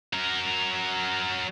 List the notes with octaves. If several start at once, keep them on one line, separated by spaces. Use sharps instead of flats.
F#3 A#4